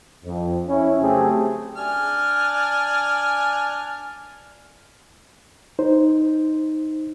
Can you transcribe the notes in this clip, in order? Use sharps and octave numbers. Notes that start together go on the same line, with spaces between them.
F2
C#4 E4
C#3 F#3 A3 C4 G4 G#4
D4 G#5 F6
D#4 C5